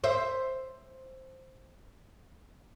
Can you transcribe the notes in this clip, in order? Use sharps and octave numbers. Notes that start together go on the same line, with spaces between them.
C5 E5